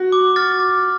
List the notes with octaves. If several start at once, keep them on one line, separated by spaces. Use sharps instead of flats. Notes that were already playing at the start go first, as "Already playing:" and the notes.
Already playing: F#4
D6
F6 A6
D6